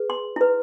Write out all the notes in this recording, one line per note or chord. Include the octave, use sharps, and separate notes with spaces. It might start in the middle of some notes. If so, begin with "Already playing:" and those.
Already playing: G#4 B4
C6
E4 B4